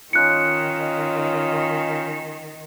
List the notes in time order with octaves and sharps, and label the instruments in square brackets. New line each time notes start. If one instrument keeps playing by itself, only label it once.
[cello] D#3 [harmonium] C#4 D#4 F4 [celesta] F#6 C#7